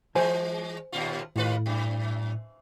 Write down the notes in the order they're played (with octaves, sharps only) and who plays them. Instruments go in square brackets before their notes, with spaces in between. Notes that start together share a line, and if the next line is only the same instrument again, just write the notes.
[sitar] E3 G#3 [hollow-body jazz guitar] C5 G#5
[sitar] D#2 A#2 F4
[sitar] D#2 F4 B4 [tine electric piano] A2
[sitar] F#2